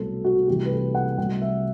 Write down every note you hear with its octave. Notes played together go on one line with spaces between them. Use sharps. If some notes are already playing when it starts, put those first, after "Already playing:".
Already playing: C2 B2 F#3 A3 A4
F#4
C2 C3 E3 A3 G4
B4
A4
F#5
C2 C3 F#3 A3 F#5
E5